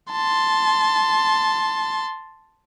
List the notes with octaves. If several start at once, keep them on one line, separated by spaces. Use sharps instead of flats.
A5 C6